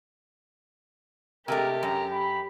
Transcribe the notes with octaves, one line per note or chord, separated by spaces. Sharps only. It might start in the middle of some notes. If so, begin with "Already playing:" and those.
C3 G#3 A3 G4 A#4
F#2 A#5
B5